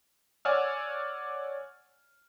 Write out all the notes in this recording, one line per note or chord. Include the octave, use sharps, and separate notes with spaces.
C#5 D5 F#5 G#5 E6 F6